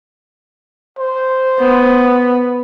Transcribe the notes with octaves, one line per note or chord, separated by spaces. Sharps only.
C5
B3